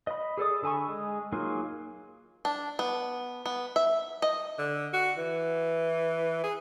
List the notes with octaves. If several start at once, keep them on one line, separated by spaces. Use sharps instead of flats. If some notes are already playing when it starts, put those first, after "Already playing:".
D#5 B5
G#4 A4 D5 D#6
D3 A4 G#5 B5 C#6
G#3
F#3 A#3 D#4 F4 G#4
D4
B3
B3
E5
D#5
D3
F#4
E3
G#4